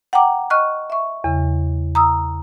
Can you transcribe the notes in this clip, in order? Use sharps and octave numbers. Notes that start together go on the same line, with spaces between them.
F#5 G5 A#5 D6
D#5 C#6 F6 F#6
E5 C#6
E2 C#3
A#5 D#6 E6